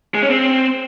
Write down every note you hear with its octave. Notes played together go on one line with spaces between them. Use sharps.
G#3
C#4
C4